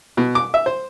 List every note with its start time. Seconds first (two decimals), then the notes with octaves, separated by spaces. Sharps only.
0.17 B2
0.35 D6
0.54 E5
0.66 C5